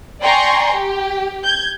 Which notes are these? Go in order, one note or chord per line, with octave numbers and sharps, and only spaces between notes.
D5 G5 G#5 A#5 C6 C#6
G4
G6 G#6